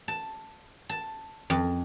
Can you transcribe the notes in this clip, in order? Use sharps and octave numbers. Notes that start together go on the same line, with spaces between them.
A5
A5
F2